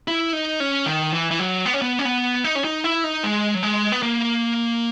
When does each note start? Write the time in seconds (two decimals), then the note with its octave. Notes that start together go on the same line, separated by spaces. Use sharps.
0.08 E4
0.33 D#4
0.60 C#4
0.86 D#3
1.13 E3
1.31 E3
1.39 F#3
1.66 B3
1.73 C#4
1.82 B3
1.99 C#4
2.05 B3
2.44 D#4
2.55 C#4
2.64 D#4
2.84 E4
3.04 D#4
3.24 G#3
3.55 F#3
3.63 G#3
3.92 B3
4.03 A#3